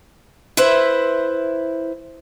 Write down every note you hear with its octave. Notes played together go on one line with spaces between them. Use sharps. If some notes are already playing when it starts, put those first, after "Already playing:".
E4 B4 C5 E5